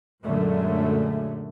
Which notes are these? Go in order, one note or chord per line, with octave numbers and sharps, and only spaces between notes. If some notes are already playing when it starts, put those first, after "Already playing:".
F#2 A#2 D3 F#3 G#3 A3